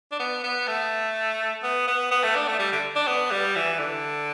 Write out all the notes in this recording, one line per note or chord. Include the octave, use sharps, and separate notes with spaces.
D4
B3
B3
A3
B3
B3
B3
A3
D4
A3
G3
D3
D4
B3
G3
E3
D3